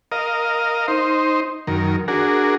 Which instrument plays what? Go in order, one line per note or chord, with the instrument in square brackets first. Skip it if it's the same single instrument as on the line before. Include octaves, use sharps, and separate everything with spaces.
[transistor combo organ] A#4 D#5 F5
D#4 C5
F#2 D#3 A#4
D4 F#4 G#4 A#4